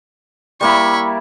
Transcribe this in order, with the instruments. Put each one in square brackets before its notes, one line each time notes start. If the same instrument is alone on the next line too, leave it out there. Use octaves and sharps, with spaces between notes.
[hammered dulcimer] G3 A#3 E4 [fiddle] B5 C#6